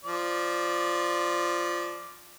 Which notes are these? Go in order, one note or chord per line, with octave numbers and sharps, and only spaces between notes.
F3 D5